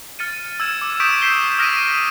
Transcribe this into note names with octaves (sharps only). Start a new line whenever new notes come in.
F6 A6 C#7 D#7
E6 G#6 E7
D6
C#6 D#6 G6 B6 D7 E7
G6 B6 C7 G7
D#6 F6 A#6 B6 D7 D#7